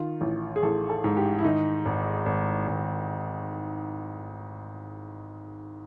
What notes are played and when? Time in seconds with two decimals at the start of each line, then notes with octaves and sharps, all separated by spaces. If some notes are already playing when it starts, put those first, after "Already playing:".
Already playing: D#3 F4
0.21 A1
0.56 G#4
0.63 A1 A4
0.90 A4
1.04 G#2
1.17 G4
1.39 E4
1.44 D#3 D#4
1.85 G#1
2.26 G#1
2.68 G#1